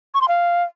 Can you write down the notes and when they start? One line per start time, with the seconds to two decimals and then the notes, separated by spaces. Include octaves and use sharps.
0.14 C#6
0.21 C6
0.28 F5